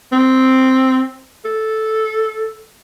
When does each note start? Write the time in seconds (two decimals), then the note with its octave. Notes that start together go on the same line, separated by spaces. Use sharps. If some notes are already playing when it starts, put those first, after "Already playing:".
0.12 C4
1.45 A4